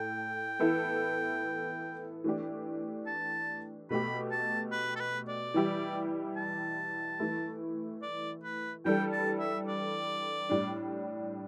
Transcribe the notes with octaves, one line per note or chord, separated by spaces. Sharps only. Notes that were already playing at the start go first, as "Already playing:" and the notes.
Already playing: A2 A4 G5
E3 B3 E4 A4
E3 A3 D4 G4
A5
B2 A3 G4 B5
A5
B4
A4
B4
D5
E3 G3 E4 G4
A5
E3 A3 E4
D5
B4
E3 G3 D4 A4 G5
A5
E5
D5
A2 G3 D4